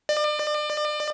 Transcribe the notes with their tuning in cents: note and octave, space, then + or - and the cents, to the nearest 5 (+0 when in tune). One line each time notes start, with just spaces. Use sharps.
D5 +35